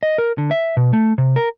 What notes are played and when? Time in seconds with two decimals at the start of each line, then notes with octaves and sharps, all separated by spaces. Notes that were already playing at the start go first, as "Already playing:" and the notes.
0.03 D#5
0.18 A#4
0.38 D3
0.51 E5
0.77 B2
0.93 A3
1.18 C3
1.36 A#4